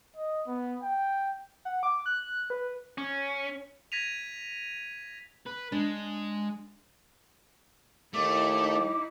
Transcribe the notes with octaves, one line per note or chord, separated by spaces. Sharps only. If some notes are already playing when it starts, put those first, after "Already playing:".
D#5
B3
G5
F#5
D6
F#6
B4
C#4
G#6 A#6 B6 D#7 F7
B4
G#3 D4
D#2 A3 D#4 E4 D6